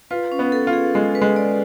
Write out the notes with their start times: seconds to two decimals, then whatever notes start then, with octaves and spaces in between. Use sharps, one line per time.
0.11 F4 B4
0.32 C#4
0.39 B3
0.52 A4
0.67 F4
0.73 G#4
0.94 G#3 A4
1.15 B4
1.22 G#3
1.36 D5